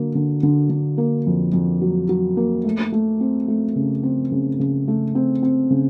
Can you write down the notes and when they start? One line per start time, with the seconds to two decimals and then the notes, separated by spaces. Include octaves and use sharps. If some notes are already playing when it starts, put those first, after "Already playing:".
Already playing: D3 F#3 A#3
0.15 D3
0.43 D3
0.70 D3
0.98 A#3
1.26 F2
1.53 F2
1.81 F#3
2.09 F#3
2.37 A#3
2.65 A3
2.92 A3
3.20 C4
3.48 A3
3.76 C#3
4.03 C4
4.32 C#3
4.60 C#3
4.88 A3
5.15 C4
5.43 C4
5.71 C#3